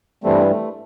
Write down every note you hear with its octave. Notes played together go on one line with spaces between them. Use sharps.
G2 E3 G3 A3 C4
A3